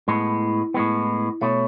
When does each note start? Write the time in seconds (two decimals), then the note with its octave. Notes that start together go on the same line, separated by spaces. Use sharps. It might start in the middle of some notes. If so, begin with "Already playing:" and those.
0.08 A2 G#3 B3 E4
0.74 A2 G#3 B3
1.41 B2 A3 C#5